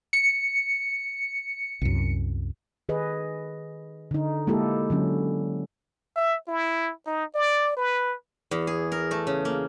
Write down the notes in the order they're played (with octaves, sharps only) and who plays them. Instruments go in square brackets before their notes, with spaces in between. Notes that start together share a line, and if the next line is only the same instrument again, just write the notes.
[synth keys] C#7
[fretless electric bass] C2 F#2
[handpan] D#3 G#4 B4 D#5
D3 D#4
G#3 A#3 E4 G4 A4
D3 F#3 C#4
[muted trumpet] E5
E4
D#4
D5
B4
[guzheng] E2
G#4
A#4
A3
C#3
A#3